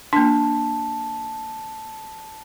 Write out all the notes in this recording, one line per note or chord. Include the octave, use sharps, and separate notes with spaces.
A#3 D4 A5